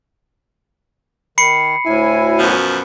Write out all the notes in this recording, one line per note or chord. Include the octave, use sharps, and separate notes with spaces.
D#3 B5 C7 C#7
D2 A2 E4 G#5
F#2 B2 F3